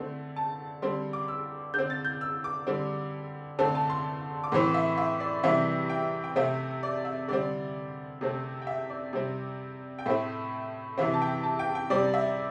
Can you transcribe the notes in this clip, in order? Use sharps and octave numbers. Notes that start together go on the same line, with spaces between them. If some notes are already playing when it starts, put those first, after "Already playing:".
Already playing: D3 A3 C4
A5
D3 G3 C4 C6
D6
E6
D3 C4 G6
A6
G6
E6
D6
D3 G3 C4
D3 A3 C4 A5
A5
C6
D6
A2 E3 C4 C6
E5
E5
D5
C3 E3 G3 C4 E5
G5
G5
C3 A3 C4 E5
D5
E5
D3 G3 C4 D5
C3 A3 C4
G5
E5
D5
C3 G3 C4
G5
A2 A3 C4 E5
C3 E3 C4 E5
A5
G5
A5
G5
G5
C3 G3 C4 D5
E5